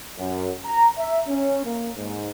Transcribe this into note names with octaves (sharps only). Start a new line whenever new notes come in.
F#2
A#5
E5
C#4
A#3
G#2